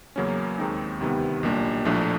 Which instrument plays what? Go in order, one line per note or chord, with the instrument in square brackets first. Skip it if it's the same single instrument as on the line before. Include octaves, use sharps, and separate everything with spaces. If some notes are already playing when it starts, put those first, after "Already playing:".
[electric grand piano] E2 C#3 F#3 A#3 C#4
D#2 D#3 G#3 C4 D#4
D2 C3 D#3 G3 B3
B1 A#2 G3 A#3 D4
A#1 A2 F3 A3 D4